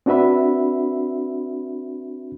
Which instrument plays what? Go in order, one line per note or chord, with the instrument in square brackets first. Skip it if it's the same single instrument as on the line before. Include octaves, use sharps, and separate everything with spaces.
[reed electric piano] C4 D4 F#4 B4 E5 B5